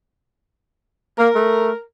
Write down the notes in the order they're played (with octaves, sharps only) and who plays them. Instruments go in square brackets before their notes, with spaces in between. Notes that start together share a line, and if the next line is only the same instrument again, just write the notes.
[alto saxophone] A#3 [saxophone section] A#4
[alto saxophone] A3